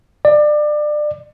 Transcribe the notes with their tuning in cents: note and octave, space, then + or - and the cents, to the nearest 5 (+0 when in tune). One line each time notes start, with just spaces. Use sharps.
D5 +25